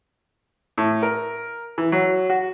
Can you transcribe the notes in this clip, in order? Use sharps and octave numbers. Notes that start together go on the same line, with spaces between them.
A2
A#4
E3
F#3
F#4